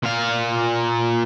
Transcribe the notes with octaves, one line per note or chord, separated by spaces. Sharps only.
A#2 F5